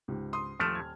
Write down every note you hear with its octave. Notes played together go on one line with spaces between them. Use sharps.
C#2 G#2 G4
C6 D#6
D#1 F3 A3 F6
G#6